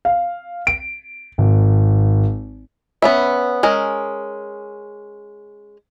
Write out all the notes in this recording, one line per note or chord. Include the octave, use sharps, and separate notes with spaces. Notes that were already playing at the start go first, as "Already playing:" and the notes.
F5
D7
G#1
B3 C#4 E5
G#3 C#4 A#4